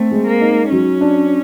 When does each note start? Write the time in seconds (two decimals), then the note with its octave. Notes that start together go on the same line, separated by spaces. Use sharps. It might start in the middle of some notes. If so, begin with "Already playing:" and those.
Already playing: A3 C4
0.11 G#3
0.27 A#3
0.41 D#4
0.71 F#3 C#4
1.01 D4